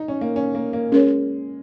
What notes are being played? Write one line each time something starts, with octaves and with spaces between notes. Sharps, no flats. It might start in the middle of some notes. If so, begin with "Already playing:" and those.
Already playing: D#4
C#4
A#3
C#4
A#3
A#3
G#3 C#4 A#4 C#5